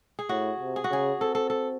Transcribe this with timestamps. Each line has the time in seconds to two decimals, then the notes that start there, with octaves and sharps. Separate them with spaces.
0.19 G#4
0.29 A2 F#4
0.60 C3
0.76 G#4
0.84 F#4
0.91 C#3 G#4
1.21 C4 A4
1.35 A4
1.50 A4